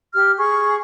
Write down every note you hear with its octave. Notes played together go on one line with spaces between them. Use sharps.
G4 F6
G#4 C#6